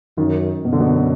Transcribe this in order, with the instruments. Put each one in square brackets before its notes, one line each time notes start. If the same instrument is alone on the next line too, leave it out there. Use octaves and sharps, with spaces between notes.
[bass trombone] F#2 [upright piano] D#3
[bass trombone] F#2 [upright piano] B2
[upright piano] D3
B2